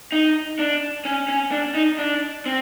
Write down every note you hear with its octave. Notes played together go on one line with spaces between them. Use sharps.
D#4
D4
C#4
C#4
D4
D#4
D4
C4